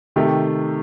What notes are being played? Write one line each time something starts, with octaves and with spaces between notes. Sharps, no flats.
C3 D#3 A3 G4